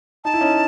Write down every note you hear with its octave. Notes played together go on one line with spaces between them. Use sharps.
D#4 A5
E4
C#4 D#4